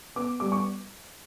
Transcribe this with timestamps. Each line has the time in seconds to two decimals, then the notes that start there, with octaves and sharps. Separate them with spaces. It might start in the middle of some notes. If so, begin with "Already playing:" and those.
0.16 B3 D6
0.40 G3 D6
0.52 C#6